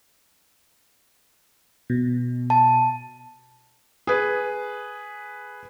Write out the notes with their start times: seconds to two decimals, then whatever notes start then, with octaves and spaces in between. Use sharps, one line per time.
1.90 B2
2.50 A5
4.07 G#4 B4